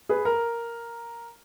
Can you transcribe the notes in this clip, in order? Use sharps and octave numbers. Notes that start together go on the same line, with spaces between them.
G#4 B4
A#4